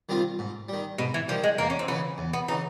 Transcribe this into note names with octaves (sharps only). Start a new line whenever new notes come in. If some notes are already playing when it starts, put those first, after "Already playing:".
D#3 G3 C4 F4
G#2
D#3 G3
G#2 B2
E3
D#3 F3 G3
G#3
E2 A#3
C#4
C4
C#3 E3 B3
E2
B3
C#3 E3 D#4